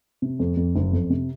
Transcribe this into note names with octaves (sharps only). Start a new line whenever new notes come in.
C3
F2
F2
F#1
F2
C3